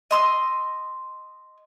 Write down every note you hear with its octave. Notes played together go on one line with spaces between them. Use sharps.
D#5 C6 E6